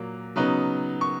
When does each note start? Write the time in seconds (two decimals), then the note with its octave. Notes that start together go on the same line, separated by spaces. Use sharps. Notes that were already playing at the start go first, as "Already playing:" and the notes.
Already playing: A#2 F#3 A#3
0.36 C#3 F#3 B3 D#4
1.01 C#6